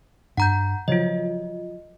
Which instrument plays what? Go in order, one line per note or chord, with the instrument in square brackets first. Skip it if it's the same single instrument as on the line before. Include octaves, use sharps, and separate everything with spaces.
[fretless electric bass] G2 [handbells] F#5 A#5 G6
[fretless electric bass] C#3 F3 F#3 [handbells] F4 D#5